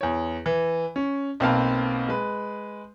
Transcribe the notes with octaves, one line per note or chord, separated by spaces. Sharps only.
E2 C#5
E3
C#4
B1 A#3 C4 B4 F5 A5
G#3 B4